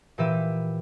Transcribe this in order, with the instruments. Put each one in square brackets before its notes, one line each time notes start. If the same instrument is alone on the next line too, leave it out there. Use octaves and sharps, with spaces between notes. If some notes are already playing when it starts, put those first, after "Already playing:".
[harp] A#2 E3 G4 E5 D#7